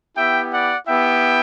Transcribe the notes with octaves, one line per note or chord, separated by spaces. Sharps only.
B3 E4 G4 E5 G5
D5 F#5
B3 E4 G4 E5 G5